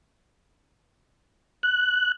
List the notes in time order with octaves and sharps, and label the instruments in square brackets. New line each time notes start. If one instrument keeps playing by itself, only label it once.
[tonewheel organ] F#6